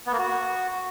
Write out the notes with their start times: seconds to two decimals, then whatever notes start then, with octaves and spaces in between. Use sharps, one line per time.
0.06 B3
0.12 A#3
0.18 F#4